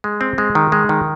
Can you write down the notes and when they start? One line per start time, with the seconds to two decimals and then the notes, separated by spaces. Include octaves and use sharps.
0.04 G#3
0.21 C4
0.38 G#3
0.55 D#3
0.72 G#3
0.89 D#3